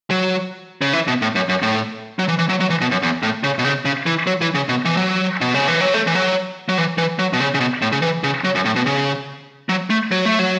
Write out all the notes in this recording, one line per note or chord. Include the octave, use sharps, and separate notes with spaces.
F#3
C#3
E3
B2
A2
F#2
F#2
A2
F#3
E3
E3
F#3
F#3
E3
B2
F#2
E2
A2
C#3
B2
C#3
C#3
E3
F#3
E3
C#3
B2
E3
F#3
B2
C#3
E3
F#3
A3
E3
F#3
F#3
E3
E3
F#3
B2
C#3
C#3
B2
A2
C#3
E3
C#3
F#3
F#2
A2
B2
C#3
F#3
A3
F#3
A3
F#3